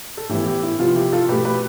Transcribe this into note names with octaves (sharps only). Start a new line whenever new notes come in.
A4
A2 E3 B3 E4 G4
E4 G4
E4
C3 F3 B3 F4
E4 G4
F4 A4
B2 A3 G4 B4
G4 B4